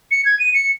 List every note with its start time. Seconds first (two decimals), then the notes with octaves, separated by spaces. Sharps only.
0.11 C#7
0.25 G#6
0.39 D#7
0.54 C#7